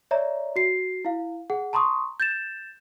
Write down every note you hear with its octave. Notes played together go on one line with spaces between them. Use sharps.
C#5 D5 E5 A#5
F#4 C7
E4 F5
G#4 F#5
A5 A#5 C6 C#6 D#6
G6 A6 E7